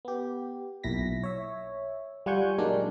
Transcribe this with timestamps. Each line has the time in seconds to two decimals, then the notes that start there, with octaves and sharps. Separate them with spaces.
0.05 B3 G4
0.84 B1 A#2 E4 A#6 B6
1.23 C#5 E5
2.26 G3 F4 F#5 G#5 C#6 G6
2.58 A#2 D#3 F#3 G#3 D4 A#4